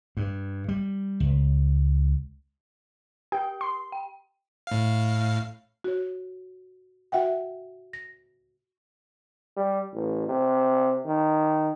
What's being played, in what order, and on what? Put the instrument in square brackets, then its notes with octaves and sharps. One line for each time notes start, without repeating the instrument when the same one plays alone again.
[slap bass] G2
G3
C#2
[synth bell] G4 [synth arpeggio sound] G5
[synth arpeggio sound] C6
[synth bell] G5
[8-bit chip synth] A2 F5
[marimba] F#4 C#5
F#4 E5 F#5 G5
A#6
[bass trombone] G3
A1
C3
D#3